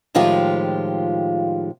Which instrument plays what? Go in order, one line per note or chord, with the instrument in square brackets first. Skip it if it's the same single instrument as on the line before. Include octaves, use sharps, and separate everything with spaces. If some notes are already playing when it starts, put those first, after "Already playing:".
[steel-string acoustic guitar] A2 D#3 F3 G#3 F4 G4